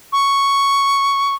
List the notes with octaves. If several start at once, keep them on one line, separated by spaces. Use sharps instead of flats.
C#6